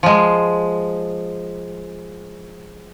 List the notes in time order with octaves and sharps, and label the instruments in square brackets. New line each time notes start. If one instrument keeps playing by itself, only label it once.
[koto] F3 G#3